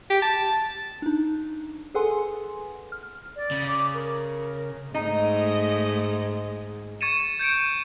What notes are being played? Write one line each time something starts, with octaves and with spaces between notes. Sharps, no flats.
G4
A5
D4 D#4
G#4 A4 B4 F#5 G#5 C6
F6
D5
C#3
D6
A#4
G#2 A3 D#4 D#5
C#6 G#6 A6 C#7 D#7 E7
G6 G#6 C#7 D7